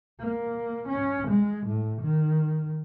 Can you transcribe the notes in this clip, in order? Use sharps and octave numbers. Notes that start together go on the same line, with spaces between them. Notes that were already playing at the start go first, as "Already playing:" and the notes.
A#3
C#4
G#3
A2
D#3